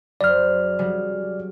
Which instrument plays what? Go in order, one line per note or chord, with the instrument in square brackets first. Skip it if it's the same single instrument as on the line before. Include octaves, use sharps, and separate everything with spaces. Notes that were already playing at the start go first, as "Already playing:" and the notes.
[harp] F#1 C5 [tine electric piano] D5 F6
[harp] C#3 F#3 G3